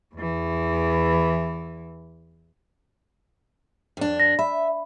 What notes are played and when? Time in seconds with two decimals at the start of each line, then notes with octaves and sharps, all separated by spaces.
0.15 E2 E3
3.97 F2 D4
4.20 A#6
4.39 E5 B5